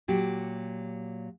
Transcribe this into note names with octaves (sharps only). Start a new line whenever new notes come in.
A#2 F#3 G4